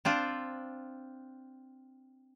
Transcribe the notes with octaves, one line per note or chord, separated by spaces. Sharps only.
C4 D4 F4